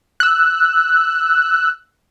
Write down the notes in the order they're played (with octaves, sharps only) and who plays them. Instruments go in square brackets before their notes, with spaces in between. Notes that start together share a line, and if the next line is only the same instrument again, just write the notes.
[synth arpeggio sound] E6 F#6